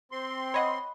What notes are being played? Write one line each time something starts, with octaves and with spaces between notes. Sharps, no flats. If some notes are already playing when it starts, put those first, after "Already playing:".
C4 C6
C#5 D#5 F#5 B5